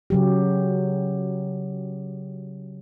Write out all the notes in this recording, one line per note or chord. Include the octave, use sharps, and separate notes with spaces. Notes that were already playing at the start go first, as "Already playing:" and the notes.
C#3 F#3 G4